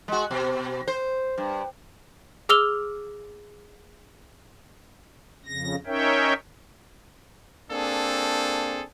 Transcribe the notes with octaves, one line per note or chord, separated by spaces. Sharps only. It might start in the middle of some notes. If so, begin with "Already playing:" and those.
G#3 F#4
B2
C5
G2
G#4 D6 E6 F6 F7 G7
F2 C#3 A#6
C#4 D#4 A#4 C#5 E5 G5
A#3 C4 D4 G#4 A4